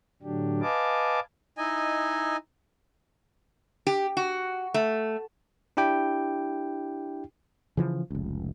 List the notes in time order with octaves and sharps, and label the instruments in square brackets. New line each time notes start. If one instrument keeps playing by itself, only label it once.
[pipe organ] A2 D3 F#3 D4 G4
B4 D#5 F5 G#5 A5 D6
[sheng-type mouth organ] D#4 E4 D#5 G#5
[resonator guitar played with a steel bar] G4
F#4
A3
[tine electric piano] D4 E4 G4 G5
[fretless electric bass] C#3 E3 F3
F1 C#2